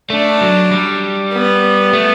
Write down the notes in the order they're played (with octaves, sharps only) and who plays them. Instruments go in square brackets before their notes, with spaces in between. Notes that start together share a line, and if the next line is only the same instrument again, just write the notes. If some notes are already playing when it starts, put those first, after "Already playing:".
[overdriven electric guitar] A3 [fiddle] D4
[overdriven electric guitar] F#3
G3
[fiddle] B3
[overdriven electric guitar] A3